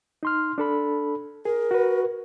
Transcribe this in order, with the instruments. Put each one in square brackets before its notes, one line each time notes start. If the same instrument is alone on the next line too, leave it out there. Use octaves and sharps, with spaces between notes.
[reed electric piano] D#4 C6 F6
D4 A4 B5
[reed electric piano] G#4 [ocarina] A#4
[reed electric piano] F#4 B4